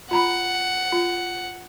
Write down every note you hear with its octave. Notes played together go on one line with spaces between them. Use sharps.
F4 F#5 A#5 B5
F4